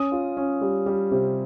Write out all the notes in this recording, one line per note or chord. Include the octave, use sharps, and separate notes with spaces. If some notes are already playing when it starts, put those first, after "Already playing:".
Already playing: C#4 D#6
F4
C#4
G3
G3
C3